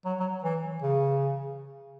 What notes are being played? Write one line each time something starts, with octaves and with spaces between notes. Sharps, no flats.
F#3
F#3
E3
C#3